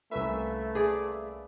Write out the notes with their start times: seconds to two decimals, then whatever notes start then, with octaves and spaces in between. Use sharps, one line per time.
0.11 C2 A3 A#3 C#4 B4 E5
0.75 G#4 D5